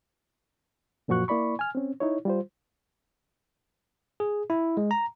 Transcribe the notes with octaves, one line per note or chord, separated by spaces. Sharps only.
F#2 A#2 F3 F#4 C#6 F#6
A#3 E4 D5 B5 C#6
G#5 F6
C4 C#4
D#4 E4 C#5
G3 F4 C5
G#4
E4
G#3
A#5